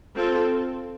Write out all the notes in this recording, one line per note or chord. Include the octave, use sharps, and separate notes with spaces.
C4 F4 A4